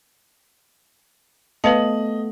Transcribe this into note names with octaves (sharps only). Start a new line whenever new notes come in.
A3 B3 B4 D#5 F5 A5 F#7